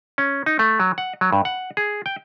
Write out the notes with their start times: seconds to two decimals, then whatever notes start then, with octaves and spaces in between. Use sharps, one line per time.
0.18 C#4
0.46 D#4
0.59 A3
0.80 F#3
0.98 F#5
1.21 F#3
1.33 G2
1.45 F#5
1.77 G#4
2.06 G5